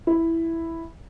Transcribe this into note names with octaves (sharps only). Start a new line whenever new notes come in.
E4